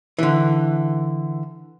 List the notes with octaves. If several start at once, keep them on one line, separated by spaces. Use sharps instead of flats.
D3 E3